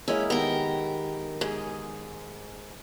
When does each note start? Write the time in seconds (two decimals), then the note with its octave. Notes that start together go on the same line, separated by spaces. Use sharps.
0.08 G#3 A#3 C#4 E4
0.30 D#3 B3 G4 A#4
1.41 G#2 G#4